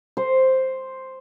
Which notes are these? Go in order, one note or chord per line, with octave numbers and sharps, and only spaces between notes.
C5